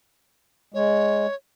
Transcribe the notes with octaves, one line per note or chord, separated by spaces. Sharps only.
G#3 C#5